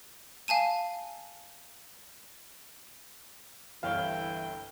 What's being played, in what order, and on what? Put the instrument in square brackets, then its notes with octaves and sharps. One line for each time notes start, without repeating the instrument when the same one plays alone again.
[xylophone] F5 G#5 A5 D#7
[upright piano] G1 C2 C#5 [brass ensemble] E3 E4 [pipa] F5 [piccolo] G5